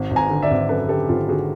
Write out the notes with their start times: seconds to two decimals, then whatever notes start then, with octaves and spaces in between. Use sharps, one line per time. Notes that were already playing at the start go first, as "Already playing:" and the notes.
Already playing: G#1
0.11 G#1
0.16 G#5 A#5
0.30 D3
0.42 D5 E5
0.50 G#1
0.69 F#2 A4 B4
0.89 D3 G4 A4
1.08 G#1 F4 G4
1.29 D3 F#4 G#4